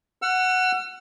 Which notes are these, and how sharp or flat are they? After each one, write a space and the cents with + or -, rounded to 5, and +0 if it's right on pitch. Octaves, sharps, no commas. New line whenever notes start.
F#5 +0 E6 +45